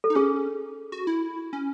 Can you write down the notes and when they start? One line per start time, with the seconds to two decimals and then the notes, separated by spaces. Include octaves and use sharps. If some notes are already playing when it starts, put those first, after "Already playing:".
0.04 A4
0.10 D#4
0.15 C#4 G#4
0.92 F#4
1.07 E4
1.53 C#4